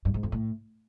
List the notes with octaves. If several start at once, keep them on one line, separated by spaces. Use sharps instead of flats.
G2
G#2
F2
A2